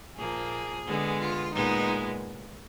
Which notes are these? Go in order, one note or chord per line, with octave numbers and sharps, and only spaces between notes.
A#2 F3 A#3 G#4
D3 G#3 B3
F4
A#2 G#3 B3 D#4